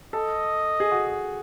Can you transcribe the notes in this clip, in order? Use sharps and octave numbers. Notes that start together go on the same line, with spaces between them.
A4 D#5
G#4
F#4